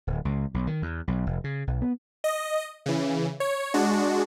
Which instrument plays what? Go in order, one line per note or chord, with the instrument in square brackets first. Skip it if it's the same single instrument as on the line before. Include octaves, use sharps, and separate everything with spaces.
[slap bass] D1
C#2
B1
D#3
E2
B1
F1
C#3
B1
B3
[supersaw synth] D#5
C#3 E3
C#5
G#3 D4 F#4